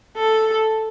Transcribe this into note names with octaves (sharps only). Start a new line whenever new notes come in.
A4